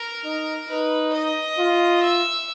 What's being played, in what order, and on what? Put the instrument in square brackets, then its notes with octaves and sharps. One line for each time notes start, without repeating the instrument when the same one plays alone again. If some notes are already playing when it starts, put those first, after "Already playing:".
Already playing: [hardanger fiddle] A#4
[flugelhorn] D#4
[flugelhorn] D#4 [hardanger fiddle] B4
[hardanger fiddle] D#5
[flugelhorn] F4
[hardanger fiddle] E5